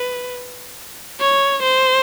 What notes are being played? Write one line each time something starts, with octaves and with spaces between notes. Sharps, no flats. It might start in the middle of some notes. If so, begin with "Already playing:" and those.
Already playing: B4
C#5
C5